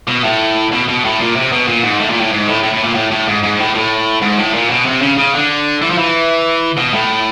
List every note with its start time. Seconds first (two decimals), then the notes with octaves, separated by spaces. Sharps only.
0.08 B2
0.24 A2
0.72 B2
0.88 B2
1.04 A2
1.20 A#2
1.36 C3
1.52 B2
1.67 A#2
1.84 G#2
2.00 A2
2.10 A#2
2.21 A2
2.32 G#2
2.48 A2
2.63 A2
2.74 A2
2.85 A#2
2.95 A2
3.11 A2
3.27 G#2
3.43 G#2
3.59 A2
3.75 A2
4.22 G#2
4.39 A2
4.54 A#2
4.70 B2
4.86 C3
5.02 C#3
5.18 C#3
5.34 D3
5.82 E3
5.90 F3
5.98 E3
6.77 B2
6.93 A2